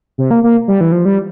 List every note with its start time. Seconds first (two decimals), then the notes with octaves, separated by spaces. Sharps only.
0.18 C3
0.31 A#3
0.44 A#3
0.68 G3
0.81 E3
0.92 F3
1.05 G3